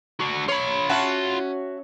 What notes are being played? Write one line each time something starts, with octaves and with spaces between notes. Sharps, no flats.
D4 F#4
F4 C#5 B5
C#4 F#4 E5 A5